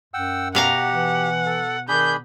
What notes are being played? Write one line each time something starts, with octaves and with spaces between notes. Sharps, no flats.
F#2 F#5 G5 E6
B2 G4 F5 F#5 A#5
E3
A4
D#3 D4 G#4 B5 G6